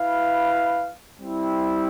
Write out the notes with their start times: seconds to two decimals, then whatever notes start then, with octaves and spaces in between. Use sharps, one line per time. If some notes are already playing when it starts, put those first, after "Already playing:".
Already playing: E4 B4 F5
1.20 G3 C4 E4